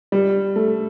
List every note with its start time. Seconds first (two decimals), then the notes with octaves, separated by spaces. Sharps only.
0.12 G3
0.56 A3